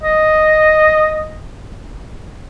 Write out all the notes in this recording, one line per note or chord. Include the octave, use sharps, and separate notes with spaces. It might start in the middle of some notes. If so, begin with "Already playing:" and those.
D#5